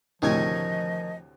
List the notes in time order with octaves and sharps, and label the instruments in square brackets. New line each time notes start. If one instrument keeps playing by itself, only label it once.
[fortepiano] D2 A2 C3 [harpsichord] D#3 C#4 G#5 [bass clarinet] F3 [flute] D#5